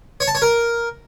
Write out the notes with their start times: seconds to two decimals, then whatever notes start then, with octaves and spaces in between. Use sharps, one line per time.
0.20 C#5
0.28 A5
0.35 C#5
0.42 A#4